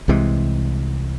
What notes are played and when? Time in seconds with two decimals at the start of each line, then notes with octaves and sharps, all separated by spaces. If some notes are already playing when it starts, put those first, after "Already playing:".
0.08 C2 C3 E3 G#3